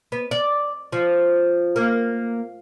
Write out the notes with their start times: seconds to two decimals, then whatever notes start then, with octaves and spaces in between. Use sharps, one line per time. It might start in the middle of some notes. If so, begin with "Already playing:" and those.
0.12 B3
0.31 D5
0.92 F3
1.76 A#3